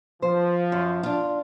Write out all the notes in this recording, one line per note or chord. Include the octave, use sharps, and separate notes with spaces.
F3 C5
F#2
D4 F4